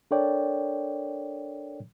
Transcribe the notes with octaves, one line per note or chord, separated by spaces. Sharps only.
D4 A4 A#4 C#5 D5 G5